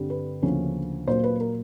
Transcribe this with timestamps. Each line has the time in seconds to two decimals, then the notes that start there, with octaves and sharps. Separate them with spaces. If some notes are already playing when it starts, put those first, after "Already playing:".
Already playing: G2 D3 G3 C4
0.10 B4
0.42 D2 C#3 F3 A#3 C#4
1.07 A#2 F#3 A#3 C5
1.24 B4
1.40 A#4